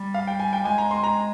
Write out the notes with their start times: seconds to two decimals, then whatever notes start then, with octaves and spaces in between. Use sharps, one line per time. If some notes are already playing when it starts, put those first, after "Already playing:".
Already playing: G3
0.14 F5
0.27 G5
0.40 G#5
0.53 G5
0.65 G#3 G#5
0.78 A#5
0.91 C6
1.03 A#5